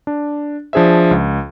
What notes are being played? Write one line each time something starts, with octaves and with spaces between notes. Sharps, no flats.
D4
F3 D4 G#4 C5 E5
C#2